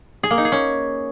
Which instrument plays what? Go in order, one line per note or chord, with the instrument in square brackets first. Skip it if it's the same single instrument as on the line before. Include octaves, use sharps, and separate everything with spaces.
[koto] G#4
A#3
D#4
G#4
C#4